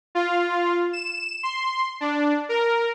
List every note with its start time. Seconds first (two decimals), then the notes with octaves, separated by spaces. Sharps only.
0.15 F4
0.93 E7
1.43 C6
2.01 D4
2.49 A#4